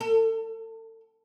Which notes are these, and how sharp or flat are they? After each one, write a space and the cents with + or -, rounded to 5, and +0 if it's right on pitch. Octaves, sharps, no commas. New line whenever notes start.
A4 +35